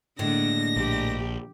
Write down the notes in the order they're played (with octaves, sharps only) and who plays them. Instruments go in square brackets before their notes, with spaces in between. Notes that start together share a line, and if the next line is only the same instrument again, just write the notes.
[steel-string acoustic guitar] A2 G#3 D4 [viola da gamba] D3 A#3 [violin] A#6
[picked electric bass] A#1 [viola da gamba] G4